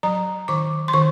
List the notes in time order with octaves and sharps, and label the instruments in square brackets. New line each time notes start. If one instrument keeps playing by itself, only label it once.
[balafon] F#3 A#5
D#3 D6
C6
D#3 C#6